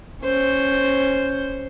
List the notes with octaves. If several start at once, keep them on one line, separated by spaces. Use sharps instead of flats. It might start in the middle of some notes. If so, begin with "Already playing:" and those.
C#4 C5